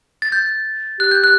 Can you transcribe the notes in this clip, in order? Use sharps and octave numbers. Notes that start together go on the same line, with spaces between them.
A6
G6
G4 F#6
G6
F#6